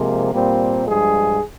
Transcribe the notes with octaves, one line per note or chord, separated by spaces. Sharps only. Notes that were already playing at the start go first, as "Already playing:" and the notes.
Already playing: C3 F3 G#3 A#3
A#2 G3 A#3 C4
G2 F3 G#3 G#4